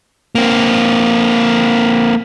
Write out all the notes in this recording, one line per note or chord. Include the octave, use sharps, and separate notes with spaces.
A#3 C4